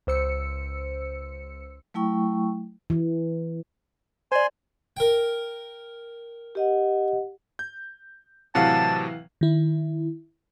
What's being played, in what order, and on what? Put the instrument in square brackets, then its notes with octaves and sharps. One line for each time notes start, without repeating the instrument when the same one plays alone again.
[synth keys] C#2 C5 E6 C#7
[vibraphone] F#3 A3 E4 G5 C#6
[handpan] E3
[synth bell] C5 D5 [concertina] G#5 C6
[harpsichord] A#4 G5
[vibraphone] G4 D#5 F#5
[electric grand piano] G6
[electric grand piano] A2 C3 F#3 [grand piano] E3 F5 F#5 [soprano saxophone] A5
[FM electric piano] D#3 E4